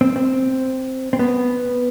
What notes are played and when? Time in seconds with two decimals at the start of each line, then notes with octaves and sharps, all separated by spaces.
0.01 C4
0.16 C4
1.13 C4
1.19 B3